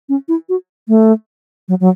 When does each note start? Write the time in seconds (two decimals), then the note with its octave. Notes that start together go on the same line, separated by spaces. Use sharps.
0.09 C#4
0.28 E4
0.49 F#4
0.88 A3
1.69 F#3
1.80 F#3